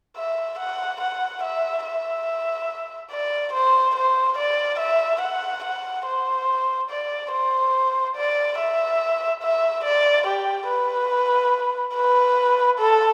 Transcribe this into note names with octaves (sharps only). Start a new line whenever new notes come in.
E5
F#5
F#5
E5
E5
D5
C5
C5
D5
E5
F#5
F#5
C5
D5
C5
D5
E5
E5
D5
G4
B4
B4
A4